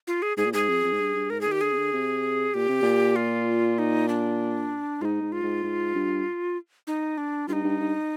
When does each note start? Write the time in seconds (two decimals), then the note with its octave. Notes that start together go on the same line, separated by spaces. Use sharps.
0.07 F4
0.22 G#4
0.37 G#2 G#4
0.45 A#2
0.53 G#2 G#4
0.69 F2
0.84 F2
0.92 G#2
1.00 G2
1.15 G2
1.30 G#2 A#4
1.41 G#4
1.47 D#3 G4
1.61 D3 G#4
1.72 C3
1.77 D3
1.93 C3
2.54 A#2 G4
2.68 C3
2.82 A#2
3.16 F4
3.79 D#4
4.09 D4
5.01 G#2 F4
5.05 D#4
5.22 G#2
5.32 F4
5.42 G#2
5.63 G#2
5.95 G2
6.87 D#4
7.18 D4
7.48 G2 D#4 F4
7.64 G2
7.80 G2